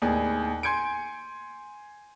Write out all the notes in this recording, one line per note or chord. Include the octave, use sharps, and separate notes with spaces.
D#2 A2 B3 G#4 D5
G#5 C6 G6 G#6 C#7 D7